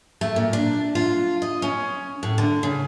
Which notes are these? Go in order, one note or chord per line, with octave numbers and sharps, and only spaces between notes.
A3
A#2
D4
F4
D#5
C#4
A2
D3
C#3